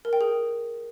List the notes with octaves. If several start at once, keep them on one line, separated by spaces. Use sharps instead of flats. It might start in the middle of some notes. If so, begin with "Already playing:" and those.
A#4
G5
G#4